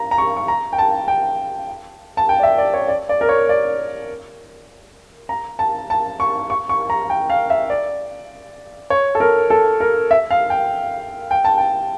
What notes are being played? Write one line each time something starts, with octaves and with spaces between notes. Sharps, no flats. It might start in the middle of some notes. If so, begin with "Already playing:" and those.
Already playing: A#5
A#5
C#6
C#6
A#5
G5
A5
G5
A5
G5
D5
E5
D5
C#5
D5
D5
A#4
C#5
D5
A#5
A5
A5
C#6
C#6
C#6
A#5
G5
F5
E5
D5
C#5
A4
A#4
A4
A#4
E5
F5
G5
G5
A5
G5